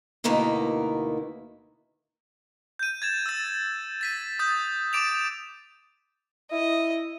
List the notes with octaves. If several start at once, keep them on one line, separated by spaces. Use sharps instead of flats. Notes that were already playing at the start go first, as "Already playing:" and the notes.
D2 B2 D#3 A#3 E4
G6 D#7
G#6 A6 E7
E6 A6
A6 B6 D#7
D#6 G6 A6
D6 A6 D7 E7 F7
E4 D#5